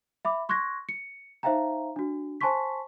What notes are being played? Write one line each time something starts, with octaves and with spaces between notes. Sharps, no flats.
E5 B5 D6
C6 C#6 F#6 G#6 A#6
C#7
D#4 C5 E5 F5 G5 A#5
D4 F#4
C5 G#5 A5 C6 C#6 B6